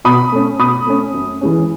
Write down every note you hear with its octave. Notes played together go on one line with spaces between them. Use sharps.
B2 B5 D#6
A3 C#4
B2 B5 D#6
A3 C#4
F#2
E3 G#3 C#4